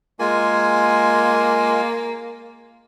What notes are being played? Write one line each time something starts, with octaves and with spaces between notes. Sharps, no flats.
G#3 A#3 F4 G#5